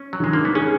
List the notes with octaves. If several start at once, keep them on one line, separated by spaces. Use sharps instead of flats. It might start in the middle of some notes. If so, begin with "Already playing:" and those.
Already playing: C#4
F#3
D#3 G#3
A#3
B3
C#4 G#4